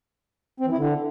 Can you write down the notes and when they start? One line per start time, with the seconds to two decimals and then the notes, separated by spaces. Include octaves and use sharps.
0.60 C4
0.66 E3
0.72 E4
0.78 D3